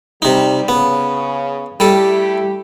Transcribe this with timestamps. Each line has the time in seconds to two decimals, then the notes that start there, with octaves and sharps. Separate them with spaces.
0.22 C3 G3 D#4
0.68 C#3 B3
1.80 G3 A3 E4 G4 A4